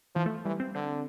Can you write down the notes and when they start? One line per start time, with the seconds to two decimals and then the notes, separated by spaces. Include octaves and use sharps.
0.15 E3 F3
0.26 A3
0.45 E3 G3
0.60 C4
0.75 D3 C4